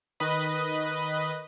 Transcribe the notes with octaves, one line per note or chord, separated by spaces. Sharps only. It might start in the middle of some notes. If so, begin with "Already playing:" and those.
D#3 B4 D#5